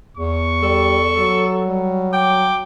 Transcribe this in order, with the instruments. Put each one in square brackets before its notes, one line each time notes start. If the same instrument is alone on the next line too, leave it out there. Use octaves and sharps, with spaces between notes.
[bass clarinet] E2 [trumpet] C#6
[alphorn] G3 [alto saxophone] A4
[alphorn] F#3
[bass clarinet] G3
[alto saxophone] G5 [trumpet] D6